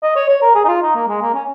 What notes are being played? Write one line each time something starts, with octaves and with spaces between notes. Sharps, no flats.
D#5
C#5
C#5
A#4
G#4
D#4
F4
D#4
A#3
G#3
A#3
C#4